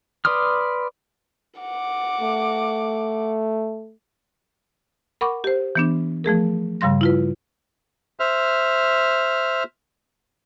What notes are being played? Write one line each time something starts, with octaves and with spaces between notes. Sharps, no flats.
B4 D5 C6 D#6 F6
F#5 D6
A3
A#4 F#5 B5 C#6 D6
G4 C5
E3 B3 D4
F3 A3 G#4 A#4
G2 C#3 G3 F5 C6 A#6
E4 F4 B4
C5 E5 F6